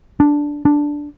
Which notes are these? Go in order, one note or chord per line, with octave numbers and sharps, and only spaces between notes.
D4
D4